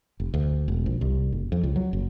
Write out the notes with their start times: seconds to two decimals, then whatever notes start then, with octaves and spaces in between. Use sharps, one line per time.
0.20 F1
0.34 D2
0.68 E1
0.86 A#1
1.01 C2
1.32 F#1
1.52 F2
1.63 C#2
1.76 F#3
1.93 F#1